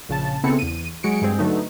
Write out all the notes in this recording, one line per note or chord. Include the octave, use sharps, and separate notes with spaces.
A#1 C#3 A5
C#3 B3 C4 E4 A4 C#7
E2 D#7
F#3 G#3 F#4 C#7 D7
G2 G#3 C4
D3 F#3 A3 B3 D#4